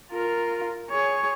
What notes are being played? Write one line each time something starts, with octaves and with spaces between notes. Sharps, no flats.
F4 A#4
G#4 C#5